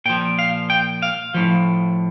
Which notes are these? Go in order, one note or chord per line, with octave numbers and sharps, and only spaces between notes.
A#2 F3 G5
F5
G5
F5
A2 F3